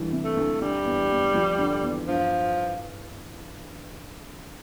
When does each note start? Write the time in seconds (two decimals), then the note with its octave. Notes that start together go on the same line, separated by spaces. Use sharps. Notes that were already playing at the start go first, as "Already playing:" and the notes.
Already playing: D2 E3 G3
0.12 C3
0.24 A3
0.37 D2
0.61 D3 G3
0.85 E2
1.10 E2
1.34 F3
1.59 D3
1.83 E2
2.08 G2 F3